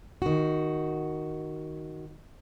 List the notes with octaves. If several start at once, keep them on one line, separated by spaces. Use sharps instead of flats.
D#3 F#4